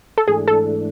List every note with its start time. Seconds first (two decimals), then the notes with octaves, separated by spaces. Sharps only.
0.18 A4
0.28 G#2 E3 A3 D4 G#4
0.48 A4